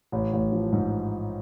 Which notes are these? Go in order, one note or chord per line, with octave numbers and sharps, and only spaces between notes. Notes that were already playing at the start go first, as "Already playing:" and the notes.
A1
A1
F3
G#2